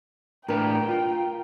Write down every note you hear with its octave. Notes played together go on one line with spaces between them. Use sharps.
A2 D4 A#4 B4 G5
F4